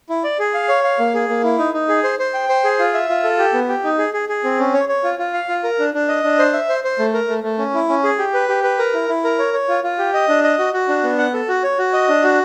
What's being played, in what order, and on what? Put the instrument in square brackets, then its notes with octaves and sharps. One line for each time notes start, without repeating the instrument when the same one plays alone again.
[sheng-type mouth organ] E4
D5
G#4
F5
C#5
F5
A#3
G#4
A#3
E4
D#4
D#4
G#4
C5
C5
G5
C5
G#4
F4
E5
F4
A4
G4
B3
G4
D#4
G#4
G#4
G#4
C4
C#4
C#5
C#5
F4
F4
F5
F4
A#4
D4
D4
D#5
D4
C5
E5
C5
C5
A3
A#4
A3
A3
C#4
E4
C#4
G#4
G4
B4
G4
B4
A#4
E4
E4
A#4
C#5
C#5
F4
F4
G4
D#5
D4
D#5
F#4
F#4
D4
B3
F#5
A4
F#4
C#5
F#4
D#5
D4
F#4